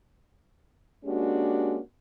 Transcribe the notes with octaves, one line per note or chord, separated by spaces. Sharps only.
G#3 A#3 C#4 D4 F#4 G4